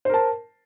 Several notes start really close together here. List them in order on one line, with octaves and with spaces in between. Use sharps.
C5 A#4 A5